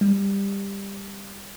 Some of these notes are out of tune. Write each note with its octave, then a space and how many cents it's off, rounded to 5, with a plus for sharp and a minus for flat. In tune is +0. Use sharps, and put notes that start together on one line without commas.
G3 +20